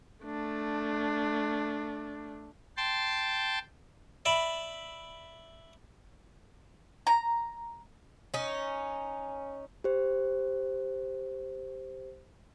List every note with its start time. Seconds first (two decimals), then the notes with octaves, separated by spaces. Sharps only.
0.25 A3 D4
2.77 G5 A5 C6
4.25 D5 E5 B5
7.07 A#5
8.34 C#4 D#4
9.84 G4 C5